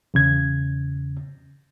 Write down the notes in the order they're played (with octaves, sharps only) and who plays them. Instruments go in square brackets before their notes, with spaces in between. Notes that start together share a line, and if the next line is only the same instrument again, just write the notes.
[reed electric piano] E2 C#3 G#6